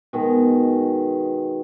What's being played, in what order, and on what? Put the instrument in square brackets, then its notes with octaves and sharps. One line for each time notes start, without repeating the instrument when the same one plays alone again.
[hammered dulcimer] B2 D#3 G#3